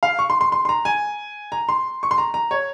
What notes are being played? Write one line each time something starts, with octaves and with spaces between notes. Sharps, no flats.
F5
C#6
C6
C6
C6
C6
A#5
G#5
A#5
C6
C#6
C6
A#5
A#5
C#5